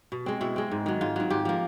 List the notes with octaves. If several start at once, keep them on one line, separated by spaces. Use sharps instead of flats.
B2
G#3 C4
B2 E4
G#3 C4
G#2
D#3 F#3
G#2 F4
D#3 F#3
G#2 G4
F3 A#3